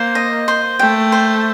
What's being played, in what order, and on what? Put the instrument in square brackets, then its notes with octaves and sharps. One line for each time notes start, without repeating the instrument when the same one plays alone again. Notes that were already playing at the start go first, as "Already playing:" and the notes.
Already playing: [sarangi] A#3 [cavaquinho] C5
[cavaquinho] D#5
C5
[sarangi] A3 [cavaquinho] G5
[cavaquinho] C5